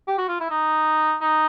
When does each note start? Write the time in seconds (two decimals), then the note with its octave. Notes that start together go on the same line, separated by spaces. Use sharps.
0.08 G4
0.18 F#4
0.29 F4
0.40 E4
0.50 D#4
1.21 D#4